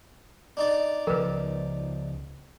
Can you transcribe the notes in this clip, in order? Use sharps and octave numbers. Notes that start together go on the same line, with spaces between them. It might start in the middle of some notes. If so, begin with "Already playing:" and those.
D4 D#4 D5
C#2 F3 A#4 B4